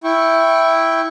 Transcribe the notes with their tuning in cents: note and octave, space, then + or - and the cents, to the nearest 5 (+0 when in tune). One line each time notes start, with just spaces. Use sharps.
E4 +0 G5 +0 C#6 -15